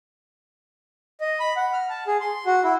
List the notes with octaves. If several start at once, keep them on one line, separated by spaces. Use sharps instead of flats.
D#5
B5
F#5
F6
A5
G#4
C6
F#4
E4